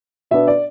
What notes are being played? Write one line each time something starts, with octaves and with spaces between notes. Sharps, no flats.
B2 B3 D4 E5
D5